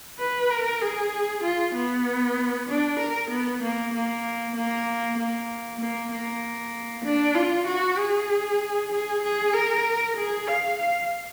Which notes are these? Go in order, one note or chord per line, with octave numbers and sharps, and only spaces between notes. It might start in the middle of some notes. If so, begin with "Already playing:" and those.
B4
A#4
G#4
F4
B3
D4
A#4
B3
A#3
A#3
A#3
A#3
A#3
A#3
D4
F4
F#4
G#4
G#4
G#4
A#4
G#4
F5
F5